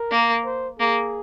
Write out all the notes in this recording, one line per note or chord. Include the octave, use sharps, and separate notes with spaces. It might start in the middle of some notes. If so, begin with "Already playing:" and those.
Already playing: A#4
A#3
C5
A#3 G#4